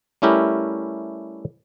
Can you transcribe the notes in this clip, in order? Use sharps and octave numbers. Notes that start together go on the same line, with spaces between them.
G3 A3 C#4 E4 G4 A#4